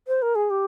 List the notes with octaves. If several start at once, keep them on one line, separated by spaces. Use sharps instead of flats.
C5
A#4
G#4
G4